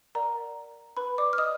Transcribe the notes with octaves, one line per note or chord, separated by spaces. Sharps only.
A#4 D5 F#5 A#5
B4 B5
D5 D6
F6
D#5 D#6